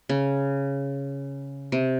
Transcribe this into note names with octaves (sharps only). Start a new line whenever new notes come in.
C#3
C3